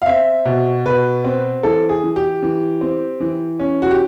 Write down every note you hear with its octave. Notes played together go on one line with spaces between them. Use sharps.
F5
C4 E5
B2
B2 B4
C4
E3 A4
G#4
E3
G4
E3
C4
E3
C#4
F#4
G4